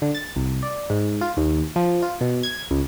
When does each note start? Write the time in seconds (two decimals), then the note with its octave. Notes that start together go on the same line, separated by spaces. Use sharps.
0.02 D3
0.15 A6
0.36 C2
0.63 D5
0.90 G#2
1.21 F4
1.37 D#2
1.76 F3
2.02 F4
2.21 B2
2.43 G#6
2.71 C#2